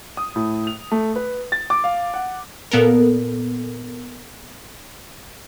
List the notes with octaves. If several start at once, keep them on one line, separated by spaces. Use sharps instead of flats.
D#6
A2
F7
A3
B4
A6
D6
F5
F#5
A#2 B3 A4 A#4